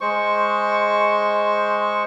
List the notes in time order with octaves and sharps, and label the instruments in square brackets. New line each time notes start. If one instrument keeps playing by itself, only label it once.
[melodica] G#3 C5 C#6